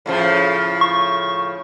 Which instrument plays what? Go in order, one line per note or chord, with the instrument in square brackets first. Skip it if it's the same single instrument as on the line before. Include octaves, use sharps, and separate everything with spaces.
[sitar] A2 C#3 F3
[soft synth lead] C#6